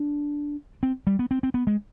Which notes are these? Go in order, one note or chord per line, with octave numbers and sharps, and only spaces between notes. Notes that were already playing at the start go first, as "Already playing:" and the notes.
Already playing: D4
C4
G3
B3
C4
C4
B3
G#3